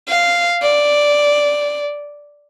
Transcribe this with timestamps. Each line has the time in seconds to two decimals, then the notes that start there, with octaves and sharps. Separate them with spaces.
0.08 F5
0.62 D5